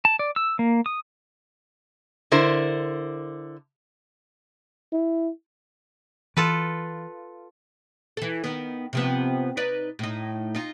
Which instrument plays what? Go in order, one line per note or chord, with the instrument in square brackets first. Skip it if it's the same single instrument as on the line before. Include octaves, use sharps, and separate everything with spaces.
[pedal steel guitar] A5
D5
E6
A#3
D#6
[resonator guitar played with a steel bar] D3 E4 A#4 C5
[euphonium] E4
[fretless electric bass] E3 [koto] F4 A4 B4
[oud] E3 A4
D#3 B3
C3 F3 B3
D#4 B4 D5
A2 D#4
D#4 F4